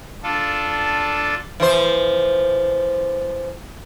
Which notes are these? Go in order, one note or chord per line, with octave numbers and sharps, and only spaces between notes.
D4 F4 A4
E3 F3 C5